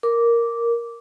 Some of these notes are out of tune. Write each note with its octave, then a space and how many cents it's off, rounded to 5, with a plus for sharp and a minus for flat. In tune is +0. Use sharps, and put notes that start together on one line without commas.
A#4 +0 D6 -10